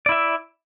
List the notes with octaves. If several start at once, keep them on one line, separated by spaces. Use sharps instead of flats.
E4 D5 E5